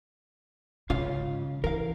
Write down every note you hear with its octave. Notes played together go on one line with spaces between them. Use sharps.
G#2 C#3 F4 F5
E3 A#4 F5